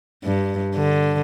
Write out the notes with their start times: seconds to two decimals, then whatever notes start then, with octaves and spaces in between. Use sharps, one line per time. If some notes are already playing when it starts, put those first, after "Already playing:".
0.24 G2
0.75 D3